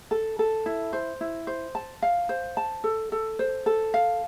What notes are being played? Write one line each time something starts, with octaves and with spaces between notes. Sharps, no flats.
A4
A4
E4
C5
E4
C5
A5
F5
C5
A5
A4
A4
C5
A4
F5